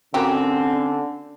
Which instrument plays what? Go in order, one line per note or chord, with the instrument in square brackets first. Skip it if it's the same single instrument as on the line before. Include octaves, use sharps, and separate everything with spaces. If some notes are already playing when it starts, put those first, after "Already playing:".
[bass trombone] D3 [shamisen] A#3 F#4 G4 [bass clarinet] C4 [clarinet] C#4